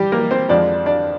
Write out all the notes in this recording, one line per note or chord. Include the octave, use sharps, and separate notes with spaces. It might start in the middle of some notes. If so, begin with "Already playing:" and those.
Already playing: G3 G4
A#3 A#4
C4 C5
F2 D3 F3 G#3 D4 D5
D4 D5